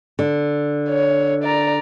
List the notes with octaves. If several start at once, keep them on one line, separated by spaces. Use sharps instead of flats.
D3
C#5
D5 A#5